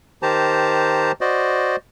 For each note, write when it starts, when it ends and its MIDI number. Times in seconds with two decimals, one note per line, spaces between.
0.22 1.12 51
0.22 1.12 67
0.22 1.12 72
0.22 1.12 81
0.22 1.12 82
1.21 1.76 66
1.21 1.76 72
1.21 1.76 74
1.21 1.76 75